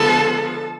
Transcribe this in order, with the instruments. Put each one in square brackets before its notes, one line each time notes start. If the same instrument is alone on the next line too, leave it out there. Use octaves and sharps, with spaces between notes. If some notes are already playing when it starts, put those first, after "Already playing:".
Already playing: [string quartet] D3 F3 G#3 B3 A4